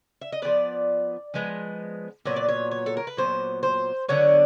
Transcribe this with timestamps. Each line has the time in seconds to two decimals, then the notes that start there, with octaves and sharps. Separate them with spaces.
0.21 E5
0.32 D#5
0.42 F3 G#3 B3 D5
1.34 F3 G#3 B3
2.25 A#2 F#3 B3 C#5
2.36 D5
2.48 C#5
2.71 C#5
2.86 A4
2.97 A#4
3.07 B4
3.17 A#2 F#3 B3 C5
3.63 C5
4.09 D3 F#3 B3 D4 C#5